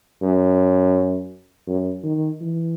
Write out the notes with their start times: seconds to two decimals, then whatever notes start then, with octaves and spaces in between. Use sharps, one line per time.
0.22 F#2
1.68 F#2
2.04 D#3
2.41 E3